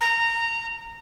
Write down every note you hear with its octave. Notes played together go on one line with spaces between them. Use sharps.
A#5